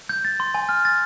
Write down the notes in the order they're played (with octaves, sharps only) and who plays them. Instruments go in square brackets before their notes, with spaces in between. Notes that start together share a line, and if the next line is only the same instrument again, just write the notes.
[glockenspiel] G6
A6
C6
G#5
F6
A6